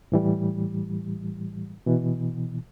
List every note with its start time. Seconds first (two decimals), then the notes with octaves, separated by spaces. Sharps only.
0.12 A2 E3 G3
1.86 B2 E3